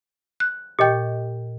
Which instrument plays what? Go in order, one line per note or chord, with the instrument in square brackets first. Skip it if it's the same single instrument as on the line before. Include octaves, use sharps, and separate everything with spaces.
[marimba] F#6
[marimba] A#2 G6 [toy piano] G4 D#5 G5